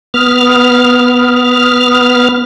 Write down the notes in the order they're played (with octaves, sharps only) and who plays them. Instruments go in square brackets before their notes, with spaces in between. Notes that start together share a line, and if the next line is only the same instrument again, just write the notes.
[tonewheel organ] B3 F6